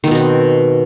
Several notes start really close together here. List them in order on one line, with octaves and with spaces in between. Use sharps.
D#3 B3 B2 C4